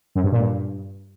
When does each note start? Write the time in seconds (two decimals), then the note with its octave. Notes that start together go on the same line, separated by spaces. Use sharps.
0.15 F#2
0.24 G2
0.32 A#2
0.41 G2